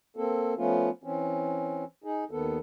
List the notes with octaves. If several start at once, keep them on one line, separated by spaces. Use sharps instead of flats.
A#3 C4 A4
F3 A3 B3 C#4 F4
E3 C4 C#4
D#4 G#4
D#2 D#3 B3 A4